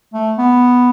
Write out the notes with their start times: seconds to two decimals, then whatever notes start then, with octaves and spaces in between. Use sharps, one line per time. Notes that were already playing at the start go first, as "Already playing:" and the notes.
0.14 A3
0.38 B3